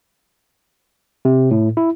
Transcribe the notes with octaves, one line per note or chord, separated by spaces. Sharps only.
C3
A2
E4